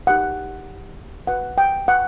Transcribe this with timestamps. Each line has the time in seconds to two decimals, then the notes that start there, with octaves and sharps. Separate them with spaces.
0.07 D#4 G4 A#4 F#5
1.27 F#4 B4 F#5
1.58 G5
1.88 F#5